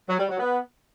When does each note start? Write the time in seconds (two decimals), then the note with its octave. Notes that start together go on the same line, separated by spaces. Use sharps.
0.08 F#3
0.18 G3
0.28 F#3
0.39 B3